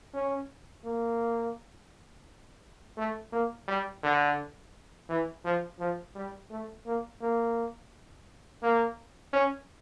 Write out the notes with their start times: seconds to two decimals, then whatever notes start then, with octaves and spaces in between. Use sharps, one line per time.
0.14 C#4
0.85 A#3
2.97 A3
3.32 A#3
3.68 G3
4.03 D3
5.09 E3
5.45 F3
5.79 F3
6.15 G3
6.50 A3
6.86 A#3
7.21 A#3
8.63 A#3
9.33 C#4